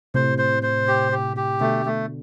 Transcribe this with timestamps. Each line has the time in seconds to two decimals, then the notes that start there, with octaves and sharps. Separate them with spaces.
0.14 A2 C3 C5
0.38 C5
0.63 C5
0.88 G4
1.12 G4
1.37 G4
1.61 B2 D3 A3
1.86 A3